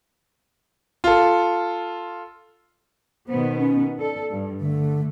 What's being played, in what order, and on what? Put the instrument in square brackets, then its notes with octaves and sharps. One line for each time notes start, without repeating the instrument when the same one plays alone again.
[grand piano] F4 A4
[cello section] B2 D#3 B3 [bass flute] C5
[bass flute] C#4
[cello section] A4 [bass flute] D5
[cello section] G2
[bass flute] D3 [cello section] A3